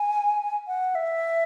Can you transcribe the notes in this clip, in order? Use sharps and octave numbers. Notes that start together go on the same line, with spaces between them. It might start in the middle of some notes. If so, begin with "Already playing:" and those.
Already playing: G#5
F#5
E5